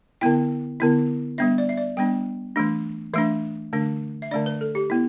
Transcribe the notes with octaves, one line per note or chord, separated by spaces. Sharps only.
D3 B3 E4 G5
D3 B3 E4
G3 B3 D4 E5
D5
E5
D5
G3 B3 D4 G5
E3 A3 D4
E3 A3 D4 E5
D3 A3 D4
E5
D3 A3 D4 D5
B4
A4
G4
B3 E4